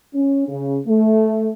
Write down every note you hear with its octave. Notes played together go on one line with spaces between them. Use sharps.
C#4
C#3
A3